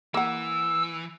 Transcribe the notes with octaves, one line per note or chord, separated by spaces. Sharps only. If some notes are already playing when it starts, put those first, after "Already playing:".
E3 A#3 F#5 E6